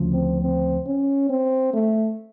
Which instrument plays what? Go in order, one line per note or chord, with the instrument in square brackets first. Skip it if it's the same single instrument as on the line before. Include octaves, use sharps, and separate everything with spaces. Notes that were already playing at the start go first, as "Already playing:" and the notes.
Already playing: [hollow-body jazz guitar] D2 C#3 F3
[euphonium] C4
C4
C#4
C4
A3